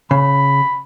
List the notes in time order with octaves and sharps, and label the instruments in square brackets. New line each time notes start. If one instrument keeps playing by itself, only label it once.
[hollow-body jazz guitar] C#3 [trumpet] B5